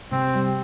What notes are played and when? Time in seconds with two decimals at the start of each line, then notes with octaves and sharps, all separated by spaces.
0.11 C3 C4
0.34 G3